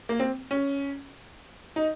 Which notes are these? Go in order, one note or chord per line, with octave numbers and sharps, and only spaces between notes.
A#3
C4
C#4
D#4